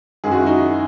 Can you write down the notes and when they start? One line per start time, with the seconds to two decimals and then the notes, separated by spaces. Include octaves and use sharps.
0.24 F#2 D#3 G#3 G#4
0.31 F#4
0.39 E4
0.46 D#4 F#4